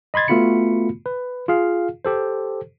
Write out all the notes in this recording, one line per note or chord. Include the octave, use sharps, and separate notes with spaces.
D#5 B5 C6 G#6 A6
A3 B3 F4 F#4 B5 C#7
B4
F4 G#4 F5
G4 A4 C5